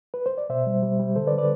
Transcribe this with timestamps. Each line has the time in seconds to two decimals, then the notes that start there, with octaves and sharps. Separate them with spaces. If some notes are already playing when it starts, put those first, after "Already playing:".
0.14 B4
0.26 C5
0.38 D5
0.50 B2 C5 E5
0.67 G3
0.83 G3
0.99 G3
1.16 D3 A4 C5
1.27 B4 D5
1.32 D3
1.38 B4 D5